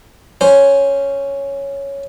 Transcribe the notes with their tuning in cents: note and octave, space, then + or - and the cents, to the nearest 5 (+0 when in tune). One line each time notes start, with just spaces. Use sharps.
C#4 +0 C5 +0